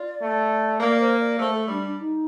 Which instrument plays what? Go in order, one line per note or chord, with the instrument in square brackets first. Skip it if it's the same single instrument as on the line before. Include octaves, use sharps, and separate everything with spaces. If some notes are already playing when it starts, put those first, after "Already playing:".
Already playing: [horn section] F4 [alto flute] D5
[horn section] A3
[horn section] A#3 [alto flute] D5
[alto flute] C5
D5
[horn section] A3 [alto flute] C5
[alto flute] A4
[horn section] G3 [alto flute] D4
[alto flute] D4
D#4